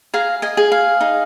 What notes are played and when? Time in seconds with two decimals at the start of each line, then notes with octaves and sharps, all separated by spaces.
0.14 G#4 F5 A#5
0.42 D#5 G#5
0.57 G#4
0.72 F5
1.01 D#4